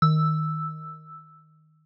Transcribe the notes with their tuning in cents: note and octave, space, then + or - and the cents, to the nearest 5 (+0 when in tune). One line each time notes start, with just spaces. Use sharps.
D#3 +0 E6 +0